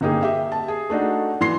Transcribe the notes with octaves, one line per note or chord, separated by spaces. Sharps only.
G1 A#3 D#4 G4 G#4
G4 E5
A5
G#4
A3 D4 D#4 F#4
E3 C6 C7